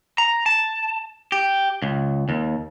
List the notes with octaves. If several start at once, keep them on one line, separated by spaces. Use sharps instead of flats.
A#5
A5
G4
C#2
D#2